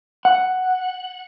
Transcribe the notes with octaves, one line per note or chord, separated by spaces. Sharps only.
F#5